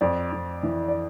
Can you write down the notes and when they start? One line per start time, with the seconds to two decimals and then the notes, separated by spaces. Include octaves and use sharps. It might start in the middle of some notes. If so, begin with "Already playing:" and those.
0.01 F2 D5
0.32 F2
0.63 E3
0.88 D5